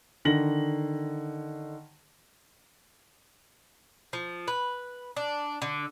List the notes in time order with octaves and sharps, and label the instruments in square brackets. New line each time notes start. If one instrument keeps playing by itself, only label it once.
[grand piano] D3 D#3 A#6 F#7
[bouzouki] F3
B4
D4
D3